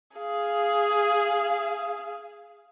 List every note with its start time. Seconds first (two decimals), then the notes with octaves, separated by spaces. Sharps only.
0.17 G#4 F5